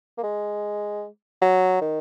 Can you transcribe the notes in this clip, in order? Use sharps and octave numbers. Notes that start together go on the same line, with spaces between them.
A#3
G#3
F#3
D#3